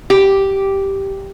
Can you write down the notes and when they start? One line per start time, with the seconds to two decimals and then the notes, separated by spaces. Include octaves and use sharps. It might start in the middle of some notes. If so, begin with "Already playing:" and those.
0.10 G4